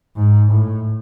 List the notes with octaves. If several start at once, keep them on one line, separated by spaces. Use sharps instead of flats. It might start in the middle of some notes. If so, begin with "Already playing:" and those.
G#2
A2